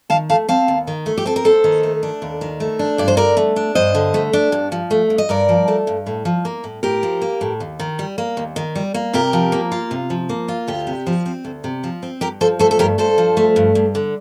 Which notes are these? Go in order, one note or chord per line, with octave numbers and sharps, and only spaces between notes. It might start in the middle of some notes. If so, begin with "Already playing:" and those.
D#3 F5 A5
A3 F5 A5
C4 F5 A5
D#2
D#3
A3
G4
C4 A4
A#4
D#2 A4 C5
D#3
A3
D4
D#2
D#3
A3
D4
G2 D5
C5
D3 A#4 D5
A3
D4
G2 C5 D#5
D3
A3
D4
G2
F3
A3
G2
D#5
G2 A#4 D5
F3
A3
G2
A2
F3
A#3
A2
A2 G4 A#4
F3
A#3
A2
D#2
D#3
G3
A#3
D#2
D#3
G3
A#3
C3 G4 A#4
F3
A#3
F4
C3
F3
A#3
F4
D2 G4
C3
F3
C4
D2
C3
F3
C4
G2 G4 A#4
F3 A4 C5
A3 A4 C5
A4
G2 G4 A#4
G2 A4 C5
F3
A3
G2
G2
D3